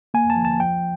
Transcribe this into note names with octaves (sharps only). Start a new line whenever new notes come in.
A#3 G#5
A5
F3
A5
F3 G5